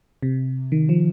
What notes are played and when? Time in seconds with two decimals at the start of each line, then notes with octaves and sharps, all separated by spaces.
0.22 C3
0.72 D#3
0.89 F3